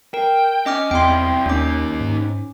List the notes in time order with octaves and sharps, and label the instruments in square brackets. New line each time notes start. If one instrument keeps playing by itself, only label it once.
[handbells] A#4 [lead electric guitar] G5
[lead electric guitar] C#4 [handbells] D#5 D6 F6
[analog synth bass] E2 [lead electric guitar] C4 E4 [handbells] G5 C6
[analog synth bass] D#2 [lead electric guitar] A#3 D#4 [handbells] C#4 D6
[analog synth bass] G#2